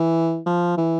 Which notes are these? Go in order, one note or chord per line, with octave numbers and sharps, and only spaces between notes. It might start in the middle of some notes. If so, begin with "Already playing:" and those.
Already playing: E3
F3
E3